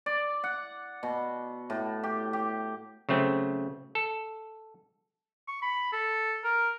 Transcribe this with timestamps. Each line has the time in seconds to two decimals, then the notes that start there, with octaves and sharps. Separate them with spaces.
0.06 D5
0.44 F#5
1.03 B2
1.70 A2
2.03 G4
2.33 G4
3.09 C#3 F#3 A3 C4
3.95 A4
5.48 C#6
5.62 B5
5.92 A4
6.44 A#4